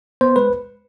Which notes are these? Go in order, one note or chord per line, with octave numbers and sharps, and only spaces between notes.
B3 C5
G#3 B4